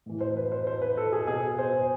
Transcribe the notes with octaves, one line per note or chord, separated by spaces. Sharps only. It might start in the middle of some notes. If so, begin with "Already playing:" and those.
A2 E3
C5
B4
C5
C5
B4
A4
G#4
B2 G#4
C5
C5